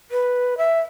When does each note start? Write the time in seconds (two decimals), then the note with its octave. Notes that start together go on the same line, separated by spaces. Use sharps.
0.11 B4
0.58 E5